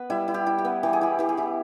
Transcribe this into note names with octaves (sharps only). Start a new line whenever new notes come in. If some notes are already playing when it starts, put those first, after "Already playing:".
Already playing: B3 B4
G3 E4
E4
G4
E4
G4
B3
E3 G4
G#4
E4 G4
E3 G4
G#4
E4 G4